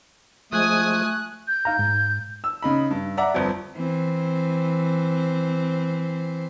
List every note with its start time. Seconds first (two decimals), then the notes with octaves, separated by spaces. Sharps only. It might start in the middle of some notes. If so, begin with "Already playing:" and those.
0.52 F3 G#3 A3 G#5 D#6 F#6
1.48 G6
1.65 D#4 F5 A#5
1.79 G#2
2.44 E6
2.62 C#3 D#4 B5
2.91 G2
3.17 D5 E5 F#5 A#5
3.34 G1 F2
3.76 E3 C4